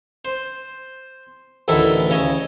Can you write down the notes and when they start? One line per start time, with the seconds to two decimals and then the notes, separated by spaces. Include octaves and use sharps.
0.25 C5
1.68 A1 D2 D#3 E4 A4
2.10 C#3 C#5 D#5